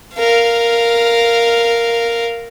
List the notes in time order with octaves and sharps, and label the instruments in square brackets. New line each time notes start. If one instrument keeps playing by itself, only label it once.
[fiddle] A#4 F5